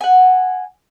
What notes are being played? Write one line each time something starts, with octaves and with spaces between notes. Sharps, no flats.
F#5 G#5